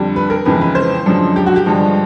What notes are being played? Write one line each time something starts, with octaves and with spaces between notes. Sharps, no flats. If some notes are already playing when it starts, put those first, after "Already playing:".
Already playing: F2 D3 G3
B4
A#4
F2 C#3 E3 G#3 B4
B4
C5
F#2 D3 F3 G#3
G4
F#4
G4
G2 D3 F3 G#3